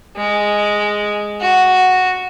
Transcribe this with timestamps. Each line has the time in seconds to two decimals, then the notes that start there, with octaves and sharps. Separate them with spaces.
0.16 G#3
1.41 F#4